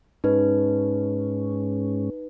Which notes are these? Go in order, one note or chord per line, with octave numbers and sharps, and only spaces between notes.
G#2 G#3 C#4 D#4 B4